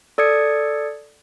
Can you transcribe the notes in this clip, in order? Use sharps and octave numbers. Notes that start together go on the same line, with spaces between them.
A4 D5 D#6 G#6 C#7